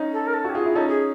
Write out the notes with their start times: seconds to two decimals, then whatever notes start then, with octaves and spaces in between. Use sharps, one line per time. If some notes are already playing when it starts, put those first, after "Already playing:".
Already playing: C#4 D#4
0.12 A4
0.27 A#4
0.34 A4
0.45 F#4
0.50 G4
0.55 F4 G#4
0.65 E4
0.75 C#4 D#4 A4
0.88 G#4